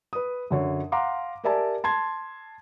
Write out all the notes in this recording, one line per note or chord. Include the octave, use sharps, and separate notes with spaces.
B4 D#6
F#2 D3 C#5
F5 F#5 A#5 C6 D6
G4 A#4 D5 E5 G#5 A5
A5 C6 G#6